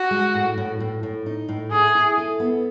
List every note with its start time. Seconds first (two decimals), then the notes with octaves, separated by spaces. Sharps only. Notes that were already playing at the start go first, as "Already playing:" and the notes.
Already playing: F#4
0.11 G#3
0.34 A2
0.58 A2
0.80 A2
1.03 A2
1.26 D#4
1.49 A2
1.71 E4 G#4
1.95 E4
2.18 A4
2.40 B3